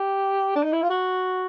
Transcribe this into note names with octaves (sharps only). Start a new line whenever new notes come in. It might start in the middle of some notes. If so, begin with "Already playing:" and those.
Already playing: G4
D4
D#4
E4
F4
F#4